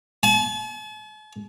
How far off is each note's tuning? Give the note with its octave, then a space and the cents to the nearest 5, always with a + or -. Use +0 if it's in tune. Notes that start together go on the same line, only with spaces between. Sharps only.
A5 -45